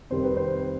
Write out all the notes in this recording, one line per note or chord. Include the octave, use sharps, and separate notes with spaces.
F2 C3 D#3 G3 C4 C5
B4
C5